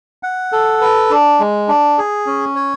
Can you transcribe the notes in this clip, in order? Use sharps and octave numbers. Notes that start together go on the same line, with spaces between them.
F#5
A4
B4
D4
G#3
D4
G#4
C#4
C#5